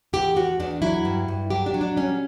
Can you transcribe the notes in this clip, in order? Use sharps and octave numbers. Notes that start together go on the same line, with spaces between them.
E2 G4
E2 F#4
E2 D4
F#3 E4
G2
G2
F#3 G4
D4
F#3
D4
G3 C#4